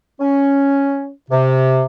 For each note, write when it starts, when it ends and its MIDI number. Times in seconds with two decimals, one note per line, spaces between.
0.21 1.10 61
1.31 1.85 48